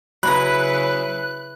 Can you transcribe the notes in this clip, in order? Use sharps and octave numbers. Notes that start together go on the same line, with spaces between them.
C#3 F#3 E4 B4 A#5 B5 F#6